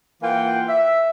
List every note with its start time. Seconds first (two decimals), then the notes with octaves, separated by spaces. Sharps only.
0.22 E3 A#3 F4 F#5 G5
0.68 E5